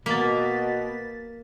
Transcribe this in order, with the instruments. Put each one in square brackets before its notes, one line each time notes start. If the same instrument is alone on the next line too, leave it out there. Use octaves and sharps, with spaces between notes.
[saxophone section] B2 [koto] A#3 [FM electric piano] A6 B6